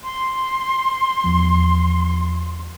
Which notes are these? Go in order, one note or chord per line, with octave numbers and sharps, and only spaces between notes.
C6
E2 F3